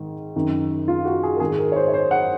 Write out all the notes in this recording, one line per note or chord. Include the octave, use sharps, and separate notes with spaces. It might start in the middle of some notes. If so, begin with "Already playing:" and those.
Already playing: G#2 D#3
F#2 D#3
F4
F#4
G#4
A#4
G#2 D#3 G#4
A#4
C#5
C5
C#5
C5
F#5